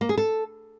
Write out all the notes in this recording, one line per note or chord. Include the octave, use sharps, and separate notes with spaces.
A#3
G#4
A4